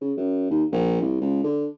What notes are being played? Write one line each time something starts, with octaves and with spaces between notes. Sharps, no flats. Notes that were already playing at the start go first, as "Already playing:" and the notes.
C#3
F#2
D#2
A#1
C2
C#2
D3